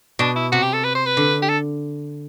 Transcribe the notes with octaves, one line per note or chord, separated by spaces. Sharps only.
B2 D4
E4
C3 F#4
G4
A4
B4
C5
B4
D3
G4
A4